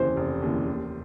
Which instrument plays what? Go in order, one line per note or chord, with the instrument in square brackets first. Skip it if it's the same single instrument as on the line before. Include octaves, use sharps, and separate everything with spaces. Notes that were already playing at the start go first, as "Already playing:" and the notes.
Already playing: [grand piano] F1 D#2 C#3 E3 [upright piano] C5
[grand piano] F1
D#2 C#3 E3
D#2